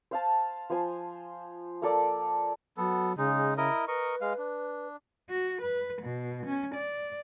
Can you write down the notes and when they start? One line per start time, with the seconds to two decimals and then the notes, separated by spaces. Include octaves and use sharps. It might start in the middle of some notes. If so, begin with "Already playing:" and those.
0.11 C5 F5 A5
0.70 F3 C5 G#5 C6
1.82 A#3 A4 D5
2.77 F#3 B3 A4
3.17 C#3 G#3 D#4
3.57 E4 A#4 D#5
3.88 A#4 B4 D#5 C#6
4.21 G#3 F5
4.38 D4
5.29 F#4
5.62 B4
6.02 B2
6.46 C#4
6.75 D5